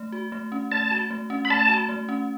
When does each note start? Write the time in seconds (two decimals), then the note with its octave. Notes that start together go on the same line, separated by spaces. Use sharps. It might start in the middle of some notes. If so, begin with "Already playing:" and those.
Already playing: A3
0.12 F#4
0.32 A3
0.52 C#4
0.72 A3 A5
0.91 F#4
1.10 A3
1.30 C#4
1.45 B5
1.50 A3 A5
1.69 F#4
1.89 A3
2.09 C#4